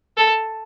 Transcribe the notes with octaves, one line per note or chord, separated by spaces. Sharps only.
A4